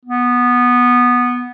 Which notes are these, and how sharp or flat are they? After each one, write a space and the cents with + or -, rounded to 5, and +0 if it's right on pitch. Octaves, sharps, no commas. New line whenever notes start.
B3 -10